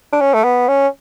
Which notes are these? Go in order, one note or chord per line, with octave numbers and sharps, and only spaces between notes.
D4
C#4
A3
B3
C#4